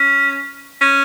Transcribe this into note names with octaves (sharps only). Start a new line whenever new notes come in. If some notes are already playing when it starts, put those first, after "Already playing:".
Already playing: C#4
C#4